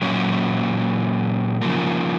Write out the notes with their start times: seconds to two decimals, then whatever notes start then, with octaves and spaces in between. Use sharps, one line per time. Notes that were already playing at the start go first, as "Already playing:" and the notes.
0.02 A#2 F#3 A#3 C#4
1.62 C#3 F3 A#3